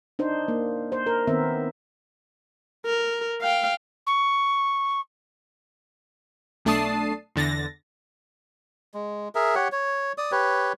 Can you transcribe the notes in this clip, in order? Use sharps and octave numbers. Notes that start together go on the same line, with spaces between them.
D4 D#4 C5
A#3
C5
A#4
D#3 B3 C4 E5
A#4
F5 G5
C#6
B1 A3 D4 A5 D#6 C7
E2 D3 A6 A#6
G#3
G#4 A#4 E5
G4 C#5 F#5
C#5
D5 D#6
G4 B4 C#5